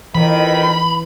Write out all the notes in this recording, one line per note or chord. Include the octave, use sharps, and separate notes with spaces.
F2 D#3 E3 B5